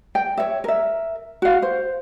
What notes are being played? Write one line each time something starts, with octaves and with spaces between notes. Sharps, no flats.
G5
C#5 E5
A#4 E5
F#4 F5
C5